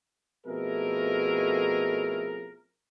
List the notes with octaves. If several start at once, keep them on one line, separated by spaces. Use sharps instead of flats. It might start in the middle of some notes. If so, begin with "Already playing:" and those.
F2 B2 A3 E4 G#4 A#4